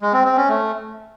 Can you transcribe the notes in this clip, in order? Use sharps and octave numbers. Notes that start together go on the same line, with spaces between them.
G#3
C4
C4
C#4
A3